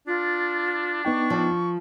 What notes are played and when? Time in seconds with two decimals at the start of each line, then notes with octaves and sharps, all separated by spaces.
0.07 D4 F4
1.05 B3 D#4 G5 C#6
1.30 F3